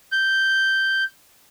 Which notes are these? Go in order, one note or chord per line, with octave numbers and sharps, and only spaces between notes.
G6